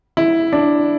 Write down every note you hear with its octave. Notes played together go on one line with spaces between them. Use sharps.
E4
D4